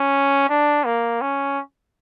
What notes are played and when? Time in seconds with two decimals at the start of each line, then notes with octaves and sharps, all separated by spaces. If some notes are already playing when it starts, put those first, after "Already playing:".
Already playing: C#4
0.50 D4
0.85 A#3
1.21 C#4